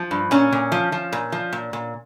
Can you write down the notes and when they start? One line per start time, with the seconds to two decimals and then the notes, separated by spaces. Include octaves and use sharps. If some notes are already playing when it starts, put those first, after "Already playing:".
Already playing: F3
0.11 G2
0.31 A#2 C#4
0.52 A#2
0.72 F3
0.92 F3
1.13 A#2
1.32 F3
1.53 A#2
1.73 A#2